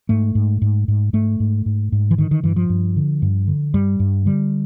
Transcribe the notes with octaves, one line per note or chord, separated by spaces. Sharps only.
G#2 A3
G#2
G#2
G#2
G#2 A3
G#2
G#2
G#2
E3
D3 D#3
D#3
G2 E3
F3
G2
D3
G2
D3
G2 G3
G2
D3 G3